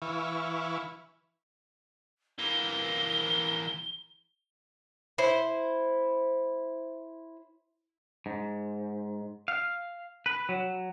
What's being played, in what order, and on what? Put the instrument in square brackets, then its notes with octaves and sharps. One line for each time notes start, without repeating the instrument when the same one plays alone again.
[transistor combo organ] E3 E4 B4 F5 C#6
[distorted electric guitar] E3 A#3 [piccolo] G7
[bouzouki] E4 C5
[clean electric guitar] G#2
F5
B4
F#3